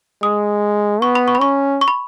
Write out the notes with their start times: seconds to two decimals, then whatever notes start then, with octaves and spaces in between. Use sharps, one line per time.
0.23 G#3 D#6
1.02 B3 C#6
1.15 B5
1.28 C#6
1.35 B5
1.41 C#4 C#6
1.81 C#6
1.88 B5